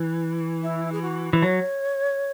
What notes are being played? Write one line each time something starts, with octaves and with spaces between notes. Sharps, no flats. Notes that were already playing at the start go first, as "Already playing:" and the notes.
Already playing: E3
E4
G#4
F#4
E3
F#3 C#5